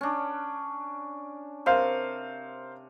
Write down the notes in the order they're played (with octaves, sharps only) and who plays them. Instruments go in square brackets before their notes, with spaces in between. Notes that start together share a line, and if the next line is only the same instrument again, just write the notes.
[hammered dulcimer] C#4 D4
[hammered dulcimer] C3 [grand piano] A#4 C5 F5